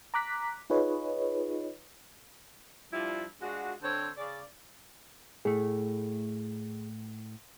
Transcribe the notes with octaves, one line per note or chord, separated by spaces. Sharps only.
A#5 D6 F#6 B6
D#4 F4 G#4 B4 C#5 D#5
F3 G3 D4 E4 F4
G#3 D4 F4 F#4
D3 C4 A4 C5 C#5
C#3 D5
A2 A3 G#4